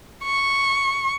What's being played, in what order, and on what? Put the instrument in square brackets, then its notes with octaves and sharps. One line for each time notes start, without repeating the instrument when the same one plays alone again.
[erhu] C#6